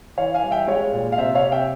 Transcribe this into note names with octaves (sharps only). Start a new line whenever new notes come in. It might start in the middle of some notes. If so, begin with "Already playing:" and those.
E3 C#5 F5
F5 G#5
G3
E5 G5
G#3 C#5 F5
A#2
F5
C3 C5 E5
C#5 F5
C3
E5 G5